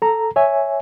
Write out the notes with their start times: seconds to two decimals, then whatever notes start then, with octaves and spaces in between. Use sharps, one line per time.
0.02 A4 A#5
0.36 C#5 E5 G#5